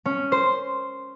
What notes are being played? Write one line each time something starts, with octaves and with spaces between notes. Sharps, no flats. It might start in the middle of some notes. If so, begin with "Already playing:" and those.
C#4
C5